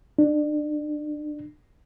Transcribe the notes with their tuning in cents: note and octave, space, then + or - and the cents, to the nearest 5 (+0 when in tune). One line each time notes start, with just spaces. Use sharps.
D4 +30